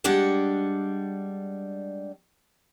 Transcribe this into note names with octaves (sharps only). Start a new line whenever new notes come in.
G3 G#3 D4 D5 F#5 G5